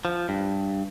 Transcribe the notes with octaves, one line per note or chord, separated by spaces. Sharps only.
F3
G2